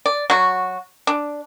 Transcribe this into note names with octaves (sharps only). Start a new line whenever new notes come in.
D5
F#3 F#4
D4